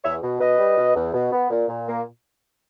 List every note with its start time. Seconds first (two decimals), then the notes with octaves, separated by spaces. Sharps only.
0.04 E2 C#5 E5
0.22 B2
0.40 B2 B4 D#5
0.59 G3
0.78 B2
0.95 E2
1.13 B2
1.32 B3
1.50 A#2
1.69 A#2
1.87 A#3